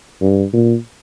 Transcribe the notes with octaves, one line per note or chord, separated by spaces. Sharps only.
G2
A#2